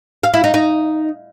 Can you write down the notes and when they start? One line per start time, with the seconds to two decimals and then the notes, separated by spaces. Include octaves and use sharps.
0.23 F5
0.34 E4
0.44 D#4
0.54 D#4